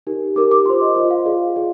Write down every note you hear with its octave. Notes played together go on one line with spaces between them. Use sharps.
D#4 G4 A#4
D#4 G4 A#4 D6
D6
F4 C5 C6
D#5
F4 C5 D#5
F5
F4 G#4 D5
F4 G#4 D5